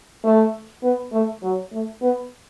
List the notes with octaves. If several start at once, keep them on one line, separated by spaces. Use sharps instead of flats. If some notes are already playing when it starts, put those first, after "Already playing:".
A3
B3
A3
F#3
A3
B3